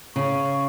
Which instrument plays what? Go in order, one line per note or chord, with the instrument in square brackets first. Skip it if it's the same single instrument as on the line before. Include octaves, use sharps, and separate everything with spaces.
[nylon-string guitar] C#3 [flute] C#6